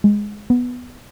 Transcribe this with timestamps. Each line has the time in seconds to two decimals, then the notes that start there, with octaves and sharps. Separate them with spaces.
0.04 G#3
0.50 B3